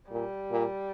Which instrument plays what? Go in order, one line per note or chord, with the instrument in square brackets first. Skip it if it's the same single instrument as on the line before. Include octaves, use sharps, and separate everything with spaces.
[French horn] A#2 [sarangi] G3
[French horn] A#2